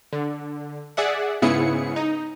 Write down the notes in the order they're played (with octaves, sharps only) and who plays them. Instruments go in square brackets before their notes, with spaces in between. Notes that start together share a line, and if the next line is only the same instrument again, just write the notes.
[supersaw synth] D3
G#4 D5 E5 F#5
G#2 C#3 B3 E4 G#4 C#7
D#4